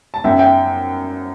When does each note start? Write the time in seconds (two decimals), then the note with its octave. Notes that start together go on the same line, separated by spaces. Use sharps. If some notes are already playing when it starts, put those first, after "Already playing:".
0.14 A5
0.24 F#2 E5 G5
0.39 E5 G5